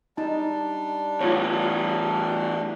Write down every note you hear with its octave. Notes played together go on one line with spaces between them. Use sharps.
G3 D4 D#4 A5
E2 A2 F4 C#5